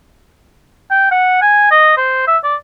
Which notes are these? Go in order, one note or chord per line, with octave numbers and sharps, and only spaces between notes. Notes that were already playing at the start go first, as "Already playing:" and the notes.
G5
F#5
G#5
D#5
C5
E5
D5